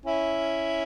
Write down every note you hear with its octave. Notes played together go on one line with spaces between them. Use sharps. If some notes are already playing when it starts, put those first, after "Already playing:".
C#4 E4